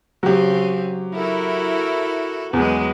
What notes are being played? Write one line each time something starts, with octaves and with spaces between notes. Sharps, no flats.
C#3 F#3 C4 G4
E4 F#4 A4 A#4
E2 F#3 G#3 B4